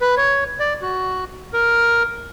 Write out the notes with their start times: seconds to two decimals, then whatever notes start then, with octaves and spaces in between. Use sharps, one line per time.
0.01 B4
0.17 C#5
0.60 D5
0.82 F#4
1.53 A#4